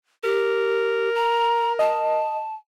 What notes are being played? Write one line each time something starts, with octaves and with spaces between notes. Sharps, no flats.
G4 A#4
A#5
D#5 A5